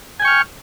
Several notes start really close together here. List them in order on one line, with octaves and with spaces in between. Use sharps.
G#5 G5 C#6 F6